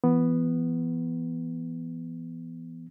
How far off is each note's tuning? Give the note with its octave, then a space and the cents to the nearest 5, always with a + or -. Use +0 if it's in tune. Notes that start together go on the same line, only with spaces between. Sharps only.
E3 +30 B3 +0